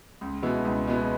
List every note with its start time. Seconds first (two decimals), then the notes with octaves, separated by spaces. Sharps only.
0.21 C#2
0.43 B2 G#3 B3 E4
0.65 C#2
0.87 B2 G#3 B3 E4